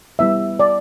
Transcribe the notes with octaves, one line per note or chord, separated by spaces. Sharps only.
G3 B3 E4 E5
D5